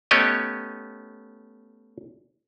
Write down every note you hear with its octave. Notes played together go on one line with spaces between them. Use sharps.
A3 B3 C#4 G4 C#5 D#5